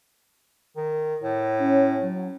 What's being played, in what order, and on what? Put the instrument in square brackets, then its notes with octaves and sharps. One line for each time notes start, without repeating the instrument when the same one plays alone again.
[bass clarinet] D#3
A2
[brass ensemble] C#4
F#3